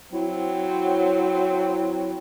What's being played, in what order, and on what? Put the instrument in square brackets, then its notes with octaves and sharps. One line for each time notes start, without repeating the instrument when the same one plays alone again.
[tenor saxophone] F#3 [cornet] C4 [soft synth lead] E4